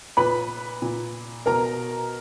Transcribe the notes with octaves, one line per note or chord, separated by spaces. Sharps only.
A#2 B4 B5
A#2
B2 A#4 A#5